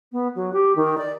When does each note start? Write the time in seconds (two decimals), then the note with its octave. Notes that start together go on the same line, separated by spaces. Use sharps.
0.12 B3
0.35 F#3
0.53 G4
0.76 D#3
0.98 D5